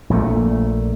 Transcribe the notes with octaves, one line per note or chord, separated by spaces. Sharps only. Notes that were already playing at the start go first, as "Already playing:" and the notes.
A#1 A#2 D#3 A3